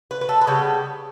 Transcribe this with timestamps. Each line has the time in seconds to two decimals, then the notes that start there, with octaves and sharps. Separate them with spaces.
0.11 B4
0.21 B4
0.29 A4
0.41 B4
0.47 C#3 G3 B3 A4